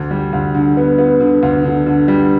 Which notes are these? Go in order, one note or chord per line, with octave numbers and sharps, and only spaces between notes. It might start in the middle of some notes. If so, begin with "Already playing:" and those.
Already playing: D2
G3
D2
D3
B3
B3
D3
D2
D3
D3
G3